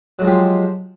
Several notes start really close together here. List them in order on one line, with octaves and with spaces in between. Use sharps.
F#3 G#3 F3 G4